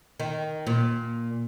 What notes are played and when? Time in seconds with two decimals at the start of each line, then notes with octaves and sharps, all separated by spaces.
0.20 D#3
0.67 A#2